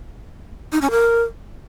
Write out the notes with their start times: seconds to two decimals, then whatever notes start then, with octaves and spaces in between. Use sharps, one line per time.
0.72 D#4
0.81 C#4
0.91 A#4